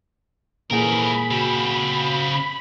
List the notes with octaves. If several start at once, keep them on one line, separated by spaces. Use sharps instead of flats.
F2 A#2 E3 A3 G#4 A#4 B5
C#3 C4 F#4